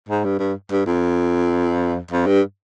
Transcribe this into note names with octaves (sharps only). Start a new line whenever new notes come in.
G#2
G2
G2
G2
F2
F2
G2